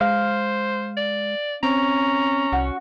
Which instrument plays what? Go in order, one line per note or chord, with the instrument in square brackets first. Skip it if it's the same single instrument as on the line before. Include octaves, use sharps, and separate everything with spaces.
[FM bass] G#3 [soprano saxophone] C5 [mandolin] F5
[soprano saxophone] D5
[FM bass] C4 [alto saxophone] C#4 [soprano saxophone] A#5
[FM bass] C2 [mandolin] F#4